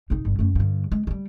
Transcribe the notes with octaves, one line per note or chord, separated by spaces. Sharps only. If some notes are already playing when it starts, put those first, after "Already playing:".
F1 D#4
G1 G2
F#2 A3
G2 D3
G#3
G3 G#3